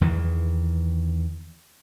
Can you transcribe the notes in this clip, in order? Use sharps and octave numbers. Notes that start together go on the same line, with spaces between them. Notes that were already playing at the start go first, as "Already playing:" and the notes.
E2 D#3 E3